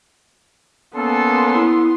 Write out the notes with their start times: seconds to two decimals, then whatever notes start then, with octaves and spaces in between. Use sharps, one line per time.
0.96 A#3 B3 C#4 A4 C6
1.55 E4